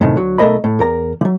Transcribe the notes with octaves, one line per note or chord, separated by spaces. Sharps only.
F#2 A2 C3 D#3
D2 F#3
B1 A3 A#3 A#4 D#5 B5
A2
E2 A#4 A#5
E3 F#3